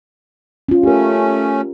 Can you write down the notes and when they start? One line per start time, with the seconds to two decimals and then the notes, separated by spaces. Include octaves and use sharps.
0.69 C#4 F4
0.83 A3 C#4 G4 A#4